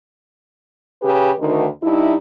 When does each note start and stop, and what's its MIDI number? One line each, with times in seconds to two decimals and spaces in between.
1.02 1.31 49
1.02 1.31 67
1.02 1.31 71
1.40 1.67 38
1.40 1.67 51
1.83 2.16 43
1.83 2.16 63
1.83 2.16 64